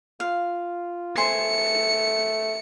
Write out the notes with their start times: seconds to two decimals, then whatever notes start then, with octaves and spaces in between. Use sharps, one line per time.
0.20 F4 F5
1.17 A3 C5 G#5 C#7